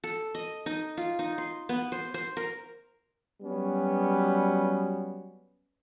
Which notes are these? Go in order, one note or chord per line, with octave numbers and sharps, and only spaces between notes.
A4
D#5
D#4
F4
D#4
C6
B3
C5
C5
A#4
F#3 G3 B3 C#4